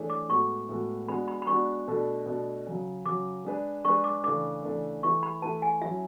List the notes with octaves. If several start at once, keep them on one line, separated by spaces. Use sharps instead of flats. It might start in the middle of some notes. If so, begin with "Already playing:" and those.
Already playing: E3 A3 D4 G#4 C#5
D6
A2 G#3 B3 F#4 A4 C#6
A2 G#3 B3 F#4 A4
G#3 B3 D4 F#4 B5
B5
B5
G#3 B3 D4 F#4 C#6
B2 A3 D4 A4
B2 A3 D4 A4
C#3 F#3 C#4
C#3 F#3 C#4 D6
G#3 D4 G#4 B4
G#3 D4 G#4 B4 C#6
D6
C#3 E3 A3 D4 D6
C#3 E3 A3 D4
E3 A3 E4 B4 C#6
B5
E3 A3 E4 B4 A5
G#5
F#3 C#4 E4 E5